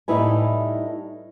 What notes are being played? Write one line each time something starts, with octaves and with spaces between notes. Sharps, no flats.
A2 G3 D#4 E4 B4 G#5